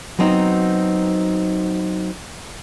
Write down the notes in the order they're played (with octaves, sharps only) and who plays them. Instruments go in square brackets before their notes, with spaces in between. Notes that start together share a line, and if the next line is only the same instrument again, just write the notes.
[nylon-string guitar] F#3 B3 C4 D#4 F#4